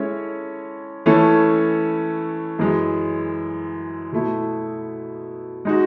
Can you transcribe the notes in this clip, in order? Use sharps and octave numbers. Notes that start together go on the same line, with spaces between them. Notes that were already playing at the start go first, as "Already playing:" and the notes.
Already playing: G#3 C#4 E4 A4 C#5
E3 A3 C#4 E4 A4
F#2 E3 G#3
B2 A3 E4
G#3 D#4 F#4